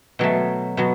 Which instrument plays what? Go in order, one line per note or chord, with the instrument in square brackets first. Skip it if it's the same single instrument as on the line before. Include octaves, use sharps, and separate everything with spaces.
[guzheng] B2 F#3 A3
B2 F#3